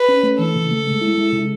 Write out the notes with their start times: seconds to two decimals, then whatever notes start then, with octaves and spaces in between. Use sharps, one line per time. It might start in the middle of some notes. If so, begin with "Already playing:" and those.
Already playing: B4
0.08 C#4
0.23 A3
0.39 E3 A4
0.56 C#3
0.71 A3
0.87 G#3
1.01 E4
1.18 G#3
1.33 C#3